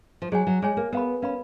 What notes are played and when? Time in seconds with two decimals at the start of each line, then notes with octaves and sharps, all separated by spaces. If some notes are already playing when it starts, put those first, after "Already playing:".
0.22 F3
0.32 F#3 G#4 C#5 G#5
0.47 F#3
0.62 G#3 G#4 C#5 G#5
0.77 A#3
0.93 B3 A#4 F5 B5
1.22 C#4 A#4 F5 B5